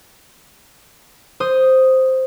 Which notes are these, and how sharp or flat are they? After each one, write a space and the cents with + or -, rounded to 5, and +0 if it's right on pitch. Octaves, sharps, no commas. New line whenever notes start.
C5 +0 D#6 +0